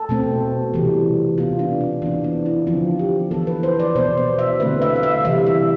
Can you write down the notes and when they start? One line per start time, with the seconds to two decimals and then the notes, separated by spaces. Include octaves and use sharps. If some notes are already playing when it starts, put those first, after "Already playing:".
Already playing: A4
0.09 B2 A3 C4
0.74 C3 E3 G3 B3
1.37 B2 B3 F4
1.59 D4
1.81 C4
2.02 E3 B3 D4
2.24 D4
2.46 E4
2.67 D3 F3 C4 F4
2.99 G4
3.31 B3 A4
3.34 E3
3.47 B4
3.63 C5
3.80 D5
3.95 B2 C5
3.98 B3
4.17 D5
4.39 E5
4.60 D3 A3 C4 B4
4.82 E5
4.96 F5
5.03 E5
5.25 C3 E3 G3 E5
5.46 E5